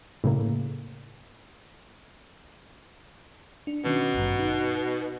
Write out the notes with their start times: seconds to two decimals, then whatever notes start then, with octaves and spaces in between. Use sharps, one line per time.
0.24 A2 C#3 A#3
3.67 D4
3.85 B2 D#3 C#4
4.14 G#1 G2
4.39 D#4